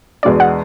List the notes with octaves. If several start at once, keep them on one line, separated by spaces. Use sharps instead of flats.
E2 B2 G#3 D4 D5
F#5